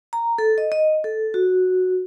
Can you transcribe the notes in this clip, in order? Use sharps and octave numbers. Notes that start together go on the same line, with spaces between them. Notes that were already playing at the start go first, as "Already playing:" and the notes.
A#5
A4
D#5
D#5
A4
F#4